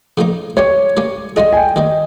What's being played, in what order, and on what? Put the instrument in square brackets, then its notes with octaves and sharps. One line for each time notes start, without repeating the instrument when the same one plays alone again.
[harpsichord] C#3 F3 A#3 D#4
[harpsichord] G3 C#4 G4 [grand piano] C#5
[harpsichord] G3 A#3 C#4 G4
[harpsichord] G3 C#4 F4 G#4 [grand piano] D#5
[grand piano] G#5
G5
[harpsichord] D#3 G3 A#3 [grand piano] D#5